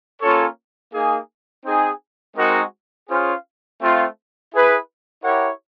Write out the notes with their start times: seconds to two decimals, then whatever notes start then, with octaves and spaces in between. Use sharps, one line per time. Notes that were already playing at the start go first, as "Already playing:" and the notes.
0.21 A#3 C#4 F4 A4 C#5
0.92 A#3 D#4 G#4
1.65 C4 D#4 G#4
2.36 G#3 C4 D#4 F#4 A#4
3.09 C#4 F4 G#4 C5 F5
3.80 A3 C4 F4
4.52 E4 G#4 B4
5.23 E4 G4 A#4 C#5 F#5